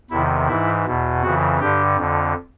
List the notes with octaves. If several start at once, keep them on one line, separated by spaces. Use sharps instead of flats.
E2 C3 D#3 E4
G#2 E3 E4
E2 B2
F2 C#3 E3 F#4
G2 D3 G4
F2 D3